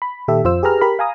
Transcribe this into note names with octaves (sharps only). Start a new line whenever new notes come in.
B5
A#2 D#3 G4 A4 E5
F2 F4 C5 E6
G4 G#4 B4 A#5 F6
G4 A#4 B5
F5 G#5 A#5 D#6